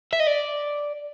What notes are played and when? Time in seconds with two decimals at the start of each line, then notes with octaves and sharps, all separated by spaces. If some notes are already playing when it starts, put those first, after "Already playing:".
0.13 E5
0.20 D#5
0.27 D5